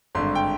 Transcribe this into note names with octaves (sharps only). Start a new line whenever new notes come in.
G#1 G2 D3 C6
G5